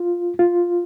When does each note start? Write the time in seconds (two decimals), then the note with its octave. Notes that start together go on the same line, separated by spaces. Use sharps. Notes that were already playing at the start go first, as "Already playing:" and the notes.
Already playing: F4
0.39 F4